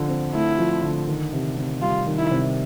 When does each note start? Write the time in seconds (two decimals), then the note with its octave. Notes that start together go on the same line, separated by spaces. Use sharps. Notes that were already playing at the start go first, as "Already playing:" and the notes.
Already playing: D3 F3
0.08 C4
0.33 A3 E4
0.58 F3
0.83 D3
1.08 D#3
1.33 C3
1.57 C3
1.82 G3 F4
2.07 D#3
2.18 E4
2.31 C3